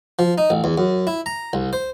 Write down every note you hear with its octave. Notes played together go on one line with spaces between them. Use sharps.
F3
D#4
A1
E2
F#2
E4
A#5
C2
C5